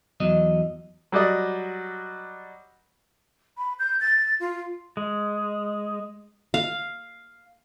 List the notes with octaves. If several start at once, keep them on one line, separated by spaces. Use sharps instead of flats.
E2 F#3 D#5
F#3 G3 D5 D#5
B5
G6
A6
F4
G#3
F5